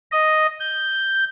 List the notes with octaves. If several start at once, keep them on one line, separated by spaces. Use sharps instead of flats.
D#5
G6